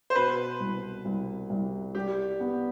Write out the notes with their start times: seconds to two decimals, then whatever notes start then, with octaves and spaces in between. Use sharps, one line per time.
0.10 C5
0.15 B2 B4
0.60 C2
1.05 C2
1.50 C2
1.95 G3 G4
2.40 B3